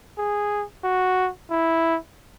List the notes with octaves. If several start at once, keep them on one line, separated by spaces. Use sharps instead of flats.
G#4
F#4
E4